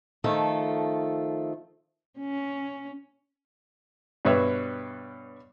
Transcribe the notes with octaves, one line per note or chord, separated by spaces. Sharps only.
D#3 F3 A3 A4
C#4
G2 B2 B4 C#5 E5